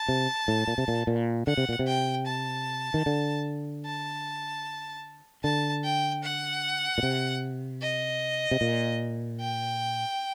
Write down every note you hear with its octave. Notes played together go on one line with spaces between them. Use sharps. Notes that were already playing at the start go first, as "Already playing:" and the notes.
Already playing: A5
C3
A2
A#2
C3
A#2
A#2
D3 F#5
C3
A#2
C3
G5
A5
D#3
D3
A5
D3 A5
G5
F#5
A#2
C3
D#5
C3
A#2
G5